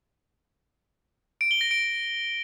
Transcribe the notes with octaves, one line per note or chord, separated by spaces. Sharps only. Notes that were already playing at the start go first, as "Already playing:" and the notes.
D7
G7
A#6
D7